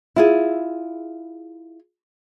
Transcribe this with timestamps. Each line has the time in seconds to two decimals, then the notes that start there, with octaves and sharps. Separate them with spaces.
0.16 E4 F4 G#4